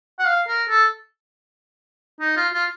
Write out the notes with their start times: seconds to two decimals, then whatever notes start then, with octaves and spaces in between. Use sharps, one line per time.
0.19 F#5
0.26 F5
0.48 A#4
0.69 A4
2.20 D#4
2.37 F4
2.54 F4